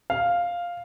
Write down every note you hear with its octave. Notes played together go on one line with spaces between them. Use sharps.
F5